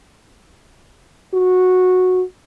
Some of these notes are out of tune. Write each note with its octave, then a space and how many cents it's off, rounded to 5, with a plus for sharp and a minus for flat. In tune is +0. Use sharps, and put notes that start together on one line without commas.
F#4 -10